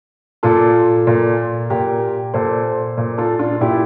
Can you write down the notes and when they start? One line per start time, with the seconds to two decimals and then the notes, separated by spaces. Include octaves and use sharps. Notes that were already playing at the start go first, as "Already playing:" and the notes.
0.43 A#2 F4 A4
1.07 A#2
1.70 A#2 G4 A#4
2.34 A#2 A4 C5
2.97 A#2
3.18 F4 A4
3.39 D4 F4
3.61 A#2 E4 G4